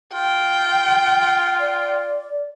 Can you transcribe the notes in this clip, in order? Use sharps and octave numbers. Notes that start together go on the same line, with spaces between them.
F4 G5
D5